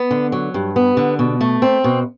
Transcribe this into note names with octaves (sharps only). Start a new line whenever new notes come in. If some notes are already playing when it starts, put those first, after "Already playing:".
Already playing: B3
D3
F#3
G2
B3
D3
B2
A3
C4
B2